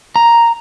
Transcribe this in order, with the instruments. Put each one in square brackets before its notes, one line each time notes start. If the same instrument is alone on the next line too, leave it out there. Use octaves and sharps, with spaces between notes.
[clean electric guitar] A#5